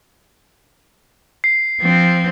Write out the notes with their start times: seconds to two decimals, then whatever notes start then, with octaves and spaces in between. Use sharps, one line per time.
1.44 C7
1.81 F3 C4